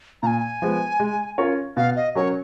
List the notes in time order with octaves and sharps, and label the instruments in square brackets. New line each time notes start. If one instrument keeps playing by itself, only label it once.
[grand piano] A#2 [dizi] G#5 A#5
[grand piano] F3 G#3 B3
G#3
C#4 F4 A#4 C#5
[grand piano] B2 [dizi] F5
[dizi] D#5
[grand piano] F#3 C#4 F#4 A#4 [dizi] C#5